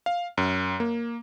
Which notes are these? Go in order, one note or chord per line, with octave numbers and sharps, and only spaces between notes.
F5
F#2
A#3